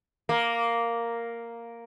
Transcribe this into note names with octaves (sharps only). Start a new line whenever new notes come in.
A#3